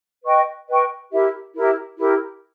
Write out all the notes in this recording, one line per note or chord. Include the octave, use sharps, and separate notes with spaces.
B4 D#5 G5 C#6
B4 D#5 G5 C#6
E4 G4 A#4 E5
E4 G4 A#4 E5
E4 G4 A#4